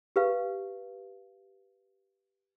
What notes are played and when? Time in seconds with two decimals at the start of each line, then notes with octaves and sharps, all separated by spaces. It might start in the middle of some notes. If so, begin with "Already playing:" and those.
0.16 G4 B4 F5